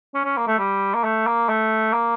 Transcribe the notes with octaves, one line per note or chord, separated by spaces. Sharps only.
C#4
C#4
A#3
A3
G3
A#3
A3
A#3
A3
A#3